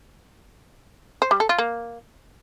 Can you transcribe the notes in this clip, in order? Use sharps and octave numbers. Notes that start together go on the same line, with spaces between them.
C5
G3
A4
F4
A#3